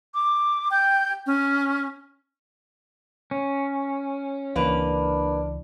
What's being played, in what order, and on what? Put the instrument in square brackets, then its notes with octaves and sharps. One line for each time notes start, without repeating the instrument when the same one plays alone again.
[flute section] D6
G5 G6
C#4
[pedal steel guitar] C#4
[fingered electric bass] C#2 E3 [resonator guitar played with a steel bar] A#3 B4 [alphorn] D4